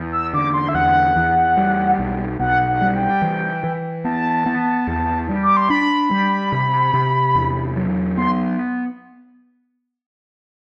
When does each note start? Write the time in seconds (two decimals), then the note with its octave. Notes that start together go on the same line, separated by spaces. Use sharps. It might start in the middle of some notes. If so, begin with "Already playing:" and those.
Already playing: E2
0.12 E6
0.34 D3 D6
0.54 C6
0.69 E5
0.74 E2 F#5
1.16 E2
1.57 G3
1.99 B1
2.39 B1 F#5
2.68 F#5
2.81 G3
2.95 G5
3.22 E3
3.64 E3
4.04 B3 A5
4.46 B3
4.87 E2
5.29 G3
5.42 D6
5.57 C6
5.70 D4 B5
6.11 G3
6.52 C3
6.94 C3
7.35 E2
7.76 F#3
8.17 B3 C6